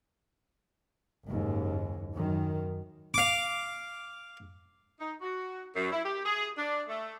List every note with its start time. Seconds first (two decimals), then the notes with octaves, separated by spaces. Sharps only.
1.27 F#1 D#2 G#2
2.12 F#2 D#3
3.14 F5 D6
5.00 D#4
5.22 F#4
5.75 F#2
5.92 E4
6.05 G4
6.26 G#4
6.58 D4
6.89 A3